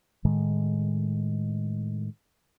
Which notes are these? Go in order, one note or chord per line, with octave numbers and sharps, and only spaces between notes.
A2 D#3 G#3